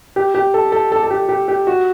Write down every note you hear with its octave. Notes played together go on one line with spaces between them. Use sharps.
G4
G4
A4
A4
A4
A4
G4
G4
G4
F#4